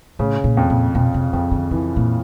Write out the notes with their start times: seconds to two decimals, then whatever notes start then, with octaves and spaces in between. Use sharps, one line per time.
0.19 A2 C#3
0.44 A#2
0.57 F2
0.70 A#2
0.95 F2 B2
1.14 C3
1.33 F2 C#3
1.51 D3
1.71 C#3 E3
1.96 A#2